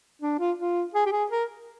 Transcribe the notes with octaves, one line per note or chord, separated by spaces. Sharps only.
D4
F4
F4
G#4
G4
G#4
A#4